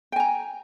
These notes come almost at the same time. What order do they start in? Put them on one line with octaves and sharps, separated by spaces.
G5 G#5 A#5